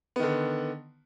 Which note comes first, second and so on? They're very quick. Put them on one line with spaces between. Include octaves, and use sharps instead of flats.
B3 D#3 D3